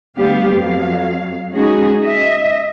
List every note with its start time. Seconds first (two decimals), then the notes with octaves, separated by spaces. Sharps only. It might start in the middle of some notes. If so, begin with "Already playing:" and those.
0.18 D2 G3 B3 G4 F5
0.52 F2 F#3 F5
1.53 G#3 C#4 D#4 F#4 G#4
2.01 D#5 E5